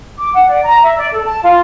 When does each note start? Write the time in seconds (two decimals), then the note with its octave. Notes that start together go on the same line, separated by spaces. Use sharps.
0.18 D6
0.34 F#5
0.49 D5
0.63 A#5
0.83 E5
0.97 D5
1.11 A4
1.23 A5
1.43 F4